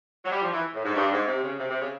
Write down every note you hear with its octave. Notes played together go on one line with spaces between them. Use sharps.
F#3
G3
F3
E3
A2
G#2
G2
G#2
C3
C#3
C3
C3
C#3